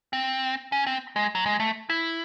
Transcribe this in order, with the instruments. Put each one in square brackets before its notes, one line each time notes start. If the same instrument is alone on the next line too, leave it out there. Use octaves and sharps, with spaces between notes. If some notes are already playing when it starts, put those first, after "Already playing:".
[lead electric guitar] C4
C#4
C4
G#3
F#3
G#3
A3
E4